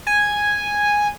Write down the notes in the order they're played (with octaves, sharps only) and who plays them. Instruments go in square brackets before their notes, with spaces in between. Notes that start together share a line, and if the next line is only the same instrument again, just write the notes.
[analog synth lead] G#5